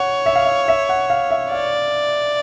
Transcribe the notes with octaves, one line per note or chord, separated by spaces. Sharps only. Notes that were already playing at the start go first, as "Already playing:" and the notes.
Already playing: C#5 F#5
E5
F5
E5
E5
F#5
F5
E5
D5 F5